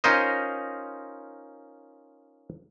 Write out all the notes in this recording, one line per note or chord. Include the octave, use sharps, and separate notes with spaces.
C#4 D#4 F4 A#4 C5 D#5